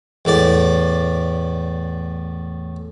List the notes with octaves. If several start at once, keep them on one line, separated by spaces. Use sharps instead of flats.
E2 A2 D5